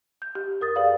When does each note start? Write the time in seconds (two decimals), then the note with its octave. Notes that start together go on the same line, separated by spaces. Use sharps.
0.22 G6
0.35 G4
0.61 F#2 A#4 D#6 A6
0.76 G#4 B4 D5 F5